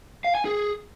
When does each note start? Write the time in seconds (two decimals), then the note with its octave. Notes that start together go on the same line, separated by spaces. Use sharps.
0.24 F5
0.35 G#5
0.45 G#4